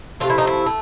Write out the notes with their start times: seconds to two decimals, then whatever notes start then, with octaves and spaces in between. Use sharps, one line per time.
0.20 C3 F3 A3 F4
0.30 E4
0.38 D#4
0.47 E4
0.66 A3